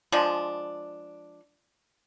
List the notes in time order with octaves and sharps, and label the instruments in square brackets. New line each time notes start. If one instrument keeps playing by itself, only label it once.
[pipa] F3 G#3 D4